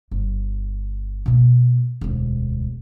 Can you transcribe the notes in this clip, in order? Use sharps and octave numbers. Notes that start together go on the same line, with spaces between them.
G1
B2 A#3
E1 D2